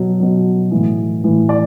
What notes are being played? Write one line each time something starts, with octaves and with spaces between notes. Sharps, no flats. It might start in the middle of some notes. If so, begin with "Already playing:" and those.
Already playing: B2 F#3
B2 F#3
A2 E3
A2 E3
D5